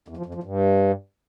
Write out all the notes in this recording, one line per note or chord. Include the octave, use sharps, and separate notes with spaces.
E2
F3
F2
F3
G2